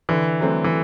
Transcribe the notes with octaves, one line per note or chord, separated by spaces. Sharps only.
D3 E3
F#3 A3 C4
E3